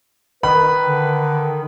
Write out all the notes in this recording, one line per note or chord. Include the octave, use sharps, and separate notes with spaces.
D#3 B4 B5
D3